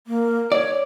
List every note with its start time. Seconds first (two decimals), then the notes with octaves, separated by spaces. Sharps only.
0.07 A#3
0.52 C#5 D5